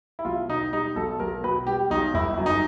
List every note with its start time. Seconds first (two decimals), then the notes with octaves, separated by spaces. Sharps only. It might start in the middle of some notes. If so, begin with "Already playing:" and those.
0.19 E4
0.25 B1 F4
0.49 B2 D#4
0.73 G3 D#4
0.96 B1 A4
1.20 B1 A#4
1.44 B2 B4
1.67 G3 G4
1.90 B1 D#4
2.14 G1 E4
2.38 F#2
2.46 D#4